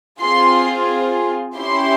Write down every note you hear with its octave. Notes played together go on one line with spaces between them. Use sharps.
C4 F4 G#4 C6
C#4 E4 G4 C6